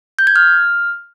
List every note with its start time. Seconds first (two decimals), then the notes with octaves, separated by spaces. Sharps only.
0.19 G6
0.27 G#6
0.36 F6